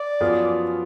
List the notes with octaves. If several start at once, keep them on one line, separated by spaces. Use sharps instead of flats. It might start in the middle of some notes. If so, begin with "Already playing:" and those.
Already playing: D5
F#2 F3 B3 F4 G#4